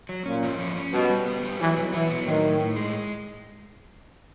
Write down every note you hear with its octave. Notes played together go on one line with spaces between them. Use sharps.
F#3
A#2 C#4
F3
C#4
C#4
B2 G3
G3
B3
G3
E3 F#3
B2
E3 B3
F#3
A2 D#3
A2
A2
G#3